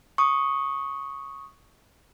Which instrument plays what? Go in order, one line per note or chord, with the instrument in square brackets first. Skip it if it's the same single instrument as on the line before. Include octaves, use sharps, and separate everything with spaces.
[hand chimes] C#6 D#6